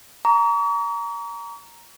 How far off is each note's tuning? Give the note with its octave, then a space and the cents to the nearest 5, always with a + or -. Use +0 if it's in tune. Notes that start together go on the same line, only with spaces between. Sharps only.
A#5 +0 C#6 +45